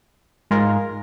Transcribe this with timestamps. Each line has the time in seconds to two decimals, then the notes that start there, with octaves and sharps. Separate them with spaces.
0.51 G#2 G#3 F4 A#4